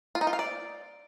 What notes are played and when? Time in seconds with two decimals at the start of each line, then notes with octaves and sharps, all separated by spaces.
0.15 F4
0.21 D#4
0.27 F4
0.33 F5
0.39 D5